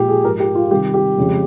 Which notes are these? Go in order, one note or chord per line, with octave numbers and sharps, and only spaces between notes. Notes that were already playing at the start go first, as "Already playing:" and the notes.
Already playing: A#2 F3 G#3 G4
G#4
G#2 F3 G#3 A#4
G4
F4
C3 D#3 G3 G4
G4
F2 C#3 G#3